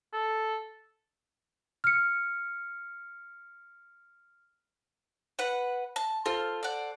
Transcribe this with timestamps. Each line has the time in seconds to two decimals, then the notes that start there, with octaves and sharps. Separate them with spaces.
0.13 A4
1.84 F6 C#7
5.39 B4 F#5
5.96 A5
6.26 F4 A4 C5
6.63 D5 F#5